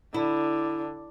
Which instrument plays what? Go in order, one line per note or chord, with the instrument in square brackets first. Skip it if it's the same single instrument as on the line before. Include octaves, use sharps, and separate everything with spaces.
[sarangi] D3 [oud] E4